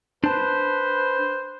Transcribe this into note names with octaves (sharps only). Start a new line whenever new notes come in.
D4 B4 C5 A5